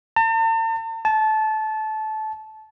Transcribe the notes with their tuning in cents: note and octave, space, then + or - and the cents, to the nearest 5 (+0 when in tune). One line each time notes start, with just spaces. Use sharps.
A5 +45
A5 -20